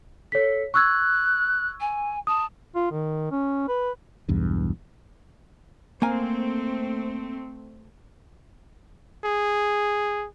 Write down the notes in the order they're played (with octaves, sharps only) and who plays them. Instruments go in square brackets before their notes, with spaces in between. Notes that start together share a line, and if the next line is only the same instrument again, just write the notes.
[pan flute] A4 [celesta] C#5 B6
[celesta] C#6 E6 G#6 [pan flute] F#6
[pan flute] G#5
[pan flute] A5 [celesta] D#6
[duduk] F4
D#3
C#4
B4
[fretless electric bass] B1 E2 G2
[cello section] A3 C4 [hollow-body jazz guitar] A#3 G#5
[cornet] G#4